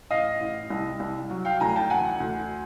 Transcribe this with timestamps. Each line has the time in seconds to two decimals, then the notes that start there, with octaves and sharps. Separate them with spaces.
0.10 A1 D#5 F5
0.40 A1
0.70 C2
1.00 C2
1.30 F#3
1.45 F5 G5
1.60 D2 G#5 A#5
1.76 G5 A5
1.90 E3 F#5 G#5
2.20 D2